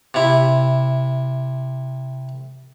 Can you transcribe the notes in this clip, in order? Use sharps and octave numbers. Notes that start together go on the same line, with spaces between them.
C3 E4